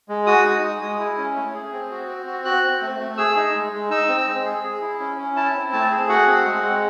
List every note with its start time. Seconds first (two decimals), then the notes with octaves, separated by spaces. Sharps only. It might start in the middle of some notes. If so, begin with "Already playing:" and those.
0.09 G#3
0.26 F#4 D#6
0.45 D#4
0.63 G#3
0.81 G#3
0.99 E4
1.18 C#4
1.36 A3
1.55 G#4
1.72 C4
1.91 F#4
2.08 C4
2.26 F#4
2.45 F#4 F#6
2.63 C4
2.82 A3
3.00 A3
3.18 G#4 E6
3.36 D#4
3.55 G#3
3.73 G#3
3.90 D#4 E6
4.08 C4
4.27 G#3
4.45 G#4
4.64 G#4
4.82 E4
4.99 C#4
5.18 C#4
5.36 E4 A5
5.54 C4
5.72 A3 A5
5.91 G#4
6.09 F#4 F#5
6.28 C4
6.45 G#3
6.63 G#3